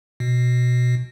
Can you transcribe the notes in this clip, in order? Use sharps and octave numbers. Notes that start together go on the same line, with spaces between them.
B2